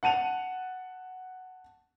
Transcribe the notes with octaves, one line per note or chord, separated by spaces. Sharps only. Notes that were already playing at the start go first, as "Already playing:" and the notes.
F#5 A5 D#7 F7